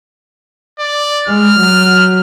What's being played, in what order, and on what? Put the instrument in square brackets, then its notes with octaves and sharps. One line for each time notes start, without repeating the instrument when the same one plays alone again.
[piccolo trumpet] D5
[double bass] G#3 [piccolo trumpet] F6
[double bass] F#3